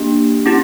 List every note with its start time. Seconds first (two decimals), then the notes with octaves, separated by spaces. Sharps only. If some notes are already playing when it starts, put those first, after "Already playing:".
Already playing: A#3 D4 G4
0.46 C#4 E4 G4